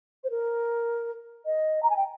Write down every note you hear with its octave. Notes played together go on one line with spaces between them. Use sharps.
C5
A#4
D#5
A#5
G#5
G5